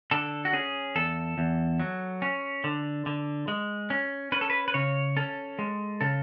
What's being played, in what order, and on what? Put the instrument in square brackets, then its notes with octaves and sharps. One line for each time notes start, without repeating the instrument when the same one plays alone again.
[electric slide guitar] D3 A4
F#4
C#4 G#4
E2 A4
E2
F#3
C#4
D3
D3
G#3
C#4
C#4 B4
A4
B4
B4
C#3 C#5
C#4 A4
G#3
C#3 A4